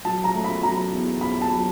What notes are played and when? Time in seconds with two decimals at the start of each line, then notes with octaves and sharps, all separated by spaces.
0.05 F#3 A5
0.24 A#5
0.34 A3
0.44 B5
0.63 F#3 A#5
0.93 E2
1.21 E2 B5
1.42 A5
1.51 F#3